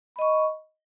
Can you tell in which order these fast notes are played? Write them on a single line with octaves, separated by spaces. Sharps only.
B5 D#5 C#6